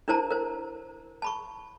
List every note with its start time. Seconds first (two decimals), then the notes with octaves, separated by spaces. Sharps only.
0.08 D4 E4 A#4 C5 A5 A#5
0.31 A#4 C5
1.22 A5 B5 C#6